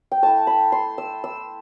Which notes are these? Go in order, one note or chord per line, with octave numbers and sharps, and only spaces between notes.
G5
A3 E4 A5
B5
C6
E6
E6